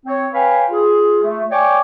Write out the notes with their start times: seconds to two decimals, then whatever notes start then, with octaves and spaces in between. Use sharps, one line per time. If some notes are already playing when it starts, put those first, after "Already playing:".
0.06 C4 C#5
0.32 B4 C#5 F5 G5 G#5 B5
0.70 F4 G#4
1.23 A3
1.50 C#5 D5 G5 G#5 C#6 D6